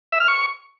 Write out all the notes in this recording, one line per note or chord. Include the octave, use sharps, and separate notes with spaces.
E5
F6
C#6